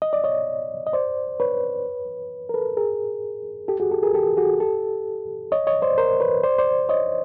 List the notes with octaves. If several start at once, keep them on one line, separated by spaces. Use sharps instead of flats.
D#5
D5
C#5 D#5
D#5
C5 D5
B4 C#5
A#4
A4 B4
G#4 A#4
G4 A4
F#4 G#4
G4 A4
G#4 A#4
G4 A4
F#4 G#4
G4 A4
C#5 D#5
C#5 D#5
C5 D5
A#4 C5
B4 C#5
C5 D5
C5 D5
C#5 D#5